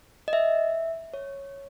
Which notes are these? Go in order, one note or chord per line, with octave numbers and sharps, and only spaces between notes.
D#5
E5
C#5